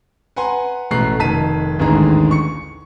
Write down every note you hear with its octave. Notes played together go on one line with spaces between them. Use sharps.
B4 F#5 G#5 A#5 C6
A1 B2 A3 A#5 F#6 C7
F1 D#3 A5 B6 D#7
A1 D#2 G#2 D3 G#4 A#5
C#6 C#7